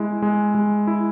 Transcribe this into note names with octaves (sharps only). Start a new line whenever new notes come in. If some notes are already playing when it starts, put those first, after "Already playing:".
Already playing: G#3 E4
G#3
G#3
E4